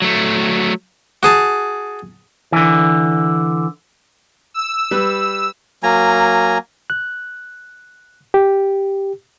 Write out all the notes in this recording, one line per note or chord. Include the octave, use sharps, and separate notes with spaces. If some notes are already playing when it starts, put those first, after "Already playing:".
F#3 A3
F#4 G#4 A5
D3 E3
E6
G3 B4
F#3 A#3 G#5 A#5
F#6
G4